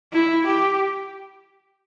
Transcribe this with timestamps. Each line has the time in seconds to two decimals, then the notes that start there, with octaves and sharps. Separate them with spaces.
0.13 E4
0.47 G4